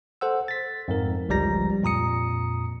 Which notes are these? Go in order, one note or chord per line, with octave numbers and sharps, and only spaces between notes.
A4 C5 F#5 E6
A6 B6
F2 G#2 A#4
G1 C#2 F3 G3 A#5 A#6
F2 A#2 A#5 D#6 C#7